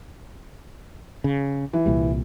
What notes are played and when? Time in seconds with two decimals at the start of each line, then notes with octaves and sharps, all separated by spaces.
1.24 C#3
1.73 E3
1.86 C2 A#2 G3